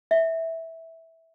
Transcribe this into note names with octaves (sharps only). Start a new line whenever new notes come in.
E5